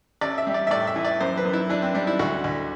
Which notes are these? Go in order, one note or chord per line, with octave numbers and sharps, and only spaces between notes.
A1 D5
E5
G3
D5
E5
A2 D5
E5
E3
D5
F#2 C5
B4
F#2
E4
E3 D4
C4
G3 D4
E4
D2 F#4
D2